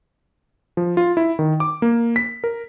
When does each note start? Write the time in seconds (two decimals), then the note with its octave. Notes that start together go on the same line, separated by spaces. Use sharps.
0.77 F3
0.97 F4
1.17 E4
1.39 D#3
1.60 D6
1.82 A#3
2.16 B6
2.44 A#4